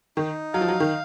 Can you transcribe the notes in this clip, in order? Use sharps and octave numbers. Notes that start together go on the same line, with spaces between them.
D#3 D#4
F#3 F5
F3
F#3
D#3